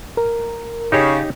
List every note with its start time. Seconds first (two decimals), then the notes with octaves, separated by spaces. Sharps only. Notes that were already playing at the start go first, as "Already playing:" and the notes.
0.17 A#4
0.92 C#3 D#4 G4 C#5